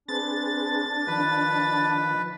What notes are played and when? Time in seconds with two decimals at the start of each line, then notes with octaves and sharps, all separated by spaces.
0.08 C4 D4 G#4 B4 A6
1.07 D#3 F3 B4